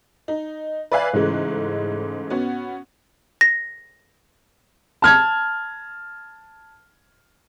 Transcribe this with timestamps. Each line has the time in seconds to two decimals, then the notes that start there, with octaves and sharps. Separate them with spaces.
0.28 D#4
0.91 B4 D5 E5 F5 G#5 F#6
1.13 G#2 C#3 E3 G#3 A3
2.30 B3 C#4 F#4
3.41 A#6
5.02 A5 F6 G#6